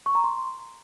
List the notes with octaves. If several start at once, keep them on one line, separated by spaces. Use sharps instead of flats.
C#6
A#5
C6